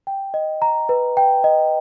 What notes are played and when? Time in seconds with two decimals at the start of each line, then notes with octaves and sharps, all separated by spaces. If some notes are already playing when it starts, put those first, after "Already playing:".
0.07 G5
0.34 D#5
0.62 A#5
0.89 B4
1.17 G5
1.44 D#5